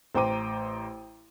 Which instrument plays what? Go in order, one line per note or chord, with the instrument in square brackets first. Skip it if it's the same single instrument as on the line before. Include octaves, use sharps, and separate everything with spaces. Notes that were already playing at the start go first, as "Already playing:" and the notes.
[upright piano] A1 C5 G5 A#5 D6 D#7